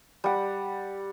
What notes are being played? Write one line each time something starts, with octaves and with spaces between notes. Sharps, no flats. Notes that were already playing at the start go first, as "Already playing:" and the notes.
G3 F#5